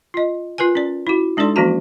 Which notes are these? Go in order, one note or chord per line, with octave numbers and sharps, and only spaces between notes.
F4 D#5
F4 A#4 B4 G#5
C#4 D5
E4 F#4
G#3 D4 D#4 A4 D5 C6
E3 F3 A#3 C#4 F#4 A#5